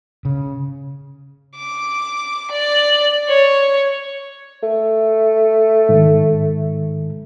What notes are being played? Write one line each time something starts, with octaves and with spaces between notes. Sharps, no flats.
C#3
D6
D5
C#5
A3
G#2 D#3